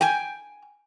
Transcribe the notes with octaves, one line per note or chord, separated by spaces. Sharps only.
G5 G#5